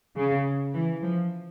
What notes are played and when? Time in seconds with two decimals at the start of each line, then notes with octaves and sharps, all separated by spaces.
0.16 C#3
0.74 E3
1.02 F3